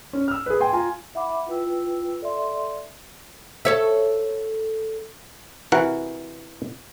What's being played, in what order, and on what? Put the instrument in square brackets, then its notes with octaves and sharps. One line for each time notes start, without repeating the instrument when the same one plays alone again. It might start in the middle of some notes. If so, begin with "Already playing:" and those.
[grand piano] C#4
E6 F6
G#4 B4
G5 G#5 C6
F4 G#5 A#5
[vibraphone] E4 E5 F#5 B5 D6
E4 F4 B4 G5 E6
A4 D5 E5 C6
[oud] A4 C#5 E5
[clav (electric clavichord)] C3 E3 F#4 A#4 F#5